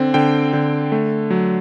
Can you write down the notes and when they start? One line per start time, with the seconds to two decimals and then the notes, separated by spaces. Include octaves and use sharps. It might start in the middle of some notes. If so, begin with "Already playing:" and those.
Already playing: D3 C4
0.14 D3 G5
0.53 D3
0.92 A3
1.30 F#3